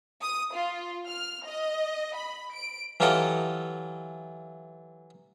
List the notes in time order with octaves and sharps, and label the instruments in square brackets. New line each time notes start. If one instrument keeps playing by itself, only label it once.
[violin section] D#6
F4
F6
D#5
B5
D7
[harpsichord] E3 F#3 F4 G4 A4 D#5